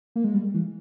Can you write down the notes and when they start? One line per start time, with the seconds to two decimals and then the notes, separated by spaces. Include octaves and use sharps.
0.16 A#3
0.24 G#3
0.34 G3
0.54 E3